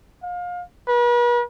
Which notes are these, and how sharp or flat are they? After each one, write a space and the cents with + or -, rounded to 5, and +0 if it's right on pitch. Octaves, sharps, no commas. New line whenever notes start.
F5 +30
B4 -40